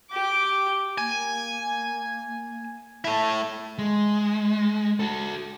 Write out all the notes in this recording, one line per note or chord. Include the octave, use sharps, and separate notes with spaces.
G4 D6
A#3 G#5
A3 E4 A5
G#3
F#4 A4